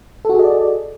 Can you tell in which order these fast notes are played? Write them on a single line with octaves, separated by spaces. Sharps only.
A4 F#4 G#4 D#5 D5